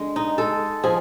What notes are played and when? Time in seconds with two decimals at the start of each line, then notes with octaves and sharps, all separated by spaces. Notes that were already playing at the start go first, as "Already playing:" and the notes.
Already playing: D3 G#3
0.16 D#4
0.38 G#3 A4
0.84 F3 G#4